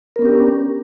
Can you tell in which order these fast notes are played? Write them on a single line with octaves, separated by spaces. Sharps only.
A#4 B3 C#4 G4 D4